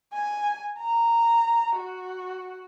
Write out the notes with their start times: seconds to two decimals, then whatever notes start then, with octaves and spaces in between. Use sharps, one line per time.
0.13 G#5
0.79 A#5
1.77 F#4